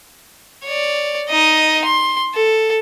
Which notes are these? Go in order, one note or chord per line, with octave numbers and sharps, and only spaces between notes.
C#5 D5
D#4 D#5
C6
A4